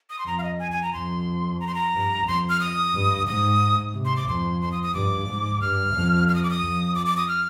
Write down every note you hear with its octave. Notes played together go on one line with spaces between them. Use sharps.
D#6
C6
F2 A#5
F5
D#5
G#5
G#5
A#5
F2 C6
A#5
C6
A#5
G2
F2 C6
F6
D#6
G2
G#2 D#6
C3
C6
D6
F2 C6
C6
D#6
D#6
G2 D6
G#2
G2 F6
F2
F6
D#6
D6
D#6
F2
D6
D6
D#6
F6